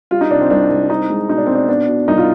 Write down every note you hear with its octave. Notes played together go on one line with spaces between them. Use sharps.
G3 F4
D#4
C3 D4
C4
C2 D4
C2
C4 D#4
G#3
B2 D#4
D4
B2 C4
D4
B3 D4
B2
C2 D#4
F4